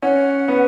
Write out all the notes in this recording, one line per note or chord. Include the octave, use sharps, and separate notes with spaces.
C#4 F#5
B3